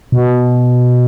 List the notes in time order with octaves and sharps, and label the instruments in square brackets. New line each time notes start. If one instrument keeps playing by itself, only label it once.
[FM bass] B2